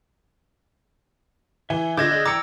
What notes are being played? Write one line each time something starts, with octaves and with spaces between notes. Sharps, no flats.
E3 E5 G#5
D3 F4 D#5 D6 G6 G#6 A#6 E7
G#4 D5 D#5
E3 D5 G5 A#5 D6 E6 C#7